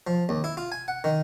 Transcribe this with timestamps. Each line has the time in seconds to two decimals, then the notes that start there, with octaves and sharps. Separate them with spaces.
0.07 F3
0.29 D#2
0.44 E4
0.57 F4
0.72 G#5
0.88 F#5
1.04 D#3